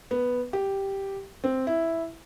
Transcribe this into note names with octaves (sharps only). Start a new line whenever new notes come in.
B3
G4
C4
E4